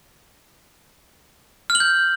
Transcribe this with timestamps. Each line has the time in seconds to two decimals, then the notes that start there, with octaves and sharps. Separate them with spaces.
1.70 F6
1.75 F#7
1.80 G6